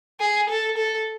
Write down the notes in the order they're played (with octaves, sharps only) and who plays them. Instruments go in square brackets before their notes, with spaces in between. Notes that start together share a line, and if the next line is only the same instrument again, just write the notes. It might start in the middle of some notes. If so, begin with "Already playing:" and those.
[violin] G#4
A4
A4